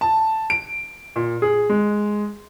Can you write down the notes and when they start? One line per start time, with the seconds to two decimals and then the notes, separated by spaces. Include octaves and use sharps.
0.01 A5
0.50 D7
1.16 A#2
1.42 G#4
1.70 G#3